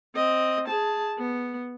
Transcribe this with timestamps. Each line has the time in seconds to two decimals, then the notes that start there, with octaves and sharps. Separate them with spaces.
0.15 C4 D#5
0.68 G#4 A5
1.19 B3